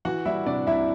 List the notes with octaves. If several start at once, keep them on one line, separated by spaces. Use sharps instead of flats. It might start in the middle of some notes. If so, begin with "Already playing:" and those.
E3 F#4 F#5
G3 E4 E5
C3 D4 D5
C2 E4 E5